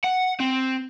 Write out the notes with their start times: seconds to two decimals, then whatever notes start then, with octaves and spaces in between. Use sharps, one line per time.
0.04 F#5
0.40 C4